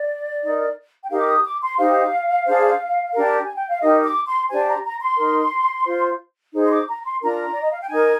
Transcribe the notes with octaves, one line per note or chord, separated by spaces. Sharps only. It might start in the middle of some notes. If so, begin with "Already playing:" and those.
Already playing: D5
D#4 A#4
G5
D#4 G4 A#4 F5
D6
D#6
D6
C6
D#4 G4 C5 F5
D4 G#4 C5
D4 G4 A#4
G#5
G5
F5
D#4 G4 A#4 D#5
D6
C6
D4 G4 C5 G#5
A#5
A#5
C6
D#4 A#4
F4 C5
D#4 G#4 C5
C6
D6
A#5
C6
D4 F4 A#4 A#5
D5
D#5
F5
G5
D#4 A#4 G#5